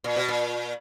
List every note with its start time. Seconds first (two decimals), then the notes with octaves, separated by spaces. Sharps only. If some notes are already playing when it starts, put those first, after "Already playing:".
0.04 A#2
0.16 B2
0.28 A#2